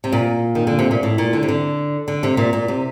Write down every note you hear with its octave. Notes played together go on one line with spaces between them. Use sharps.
C3
A#2
D#3
D3
C3
A#2
A2
A#2
D3
C3
D3
D3
C3
A#2
A#2
C3